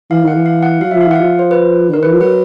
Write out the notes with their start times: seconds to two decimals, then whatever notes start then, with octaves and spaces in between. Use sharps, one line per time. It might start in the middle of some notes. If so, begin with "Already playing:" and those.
0.10 E3 F5
0.23 D#3 F#5
0.35 E3
0.46 F5
0.63 F#5
0.80 F#3 F5
0.91 F3 E5
1.01 F5
1.07 E3 F#5
1.16 F3 F5
1.39 C5
1.51 B4
1.90 D3
1.94 D#3 A#4
2.03 B4
2.05 E3
2.12 F3
2.20 F#3 B4